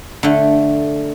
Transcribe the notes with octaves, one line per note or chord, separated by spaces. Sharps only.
D3 A3